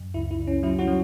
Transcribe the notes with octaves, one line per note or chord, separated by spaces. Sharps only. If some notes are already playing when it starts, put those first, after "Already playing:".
Already playing: F#2
C#2 E4
E4
C#2
C#4
F#3 E4
C#4 F#4
F#3